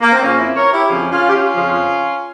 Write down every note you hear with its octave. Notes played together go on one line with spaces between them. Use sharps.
A#3
C4
F2 C#3 F3 A#3 C#4
C4 E4
A#4 C#5
E4 G4
F2 C#3 F3 C#4 F4
C#4 F4
G4
C#4 F4
F2 C#3 F3